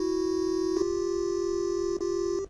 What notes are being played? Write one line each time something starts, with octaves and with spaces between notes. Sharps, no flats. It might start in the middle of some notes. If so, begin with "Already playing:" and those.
Already playing: E4 F#4
F4 G4
F4 G4